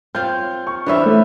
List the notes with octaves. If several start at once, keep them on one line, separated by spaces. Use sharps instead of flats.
C4 F4 C#5 G6
C#6
E3 C#4 D4 E4 C5 E5
A3